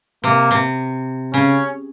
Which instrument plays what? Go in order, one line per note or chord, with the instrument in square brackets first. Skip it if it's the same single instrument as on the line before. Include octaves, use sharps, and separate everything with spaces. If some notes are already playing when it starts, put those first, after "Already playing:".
[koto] C3 [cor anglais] A#3
[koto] C3
[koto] C#3 [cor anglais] C#4